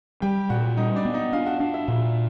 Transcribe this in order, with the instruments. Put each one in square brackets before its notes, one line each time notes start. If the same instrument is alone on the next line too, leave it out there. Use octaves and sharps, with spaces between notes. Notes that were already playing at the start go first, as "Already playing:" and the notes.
[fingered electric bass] G3 [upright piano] G4 G5
[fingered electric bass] A#2 [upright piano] F#4 F#5
[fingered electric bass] G3 [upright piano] D#4 D#5
[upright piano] D4 D5
[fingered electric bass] B3
[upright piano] D#4 D#5
[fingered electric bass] D4 [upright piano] F4 F5
[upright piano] F#4 F#5
[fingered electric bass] D4 [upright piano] F4 F5
[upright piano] E4 E5
[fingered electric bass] A#2